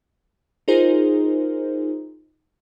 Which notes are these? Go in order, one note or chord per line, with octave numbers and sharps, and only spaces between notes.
D#4 F4 G#4 A#4 C5